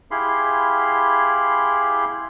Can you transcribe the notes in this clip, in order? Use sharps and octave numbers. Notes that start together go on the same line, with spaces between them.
E4 G4 G#4 F5 B5 C6